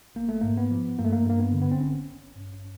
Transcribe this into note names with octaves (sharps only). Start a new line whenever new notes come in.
A1 A#3
A3
G#2 A#3
B3
F3
G2 A#3
A3
A#3
G2 A#3
B3
D3
B3
C4
G#1 C#4
G#1
G2